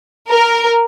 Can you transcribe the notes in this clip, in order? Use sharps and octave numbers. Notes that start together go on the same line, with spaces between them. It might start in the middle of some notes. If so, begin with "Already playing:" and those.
A#4